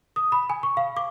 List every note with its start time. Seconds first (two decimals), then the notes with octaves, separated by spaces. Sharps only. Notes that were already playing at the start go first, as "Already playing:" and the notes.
0.16 D#6
0.32 B5
0.50 G#5
0.63 C#6
0.77 F5
0.97 D6